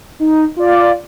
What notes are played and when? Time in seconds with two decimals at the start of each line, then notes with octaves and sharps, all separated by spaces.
0.20 D#4
0.56 F4 D5